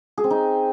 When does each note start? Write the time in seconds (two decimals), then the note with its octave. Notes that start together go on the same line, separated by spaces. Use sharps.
0.18 G#4
0.24 C4
0.31 D#4